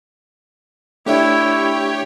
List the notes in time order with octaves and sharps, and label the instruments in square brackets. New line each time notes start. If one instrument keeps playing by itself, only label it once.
[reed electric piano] A3 D4 E5 [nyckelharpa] E4 [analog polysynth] G4 C#5 G5